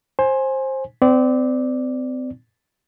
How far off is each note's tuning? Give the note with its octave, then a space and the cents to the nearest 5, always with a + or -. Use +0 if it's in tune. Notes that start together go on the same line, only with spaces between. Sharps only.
C5 +20 G#5 +0
C4 -35 D5 +0